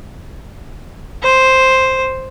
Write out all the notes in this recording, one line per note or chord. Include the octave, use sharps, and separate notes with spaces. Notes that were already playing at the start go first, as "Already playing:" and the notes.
C5